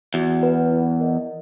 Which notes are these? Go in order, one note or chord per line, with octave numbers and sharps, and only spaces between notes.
E2 F#4
B4 F#5
E4
A#4 D#5 F#5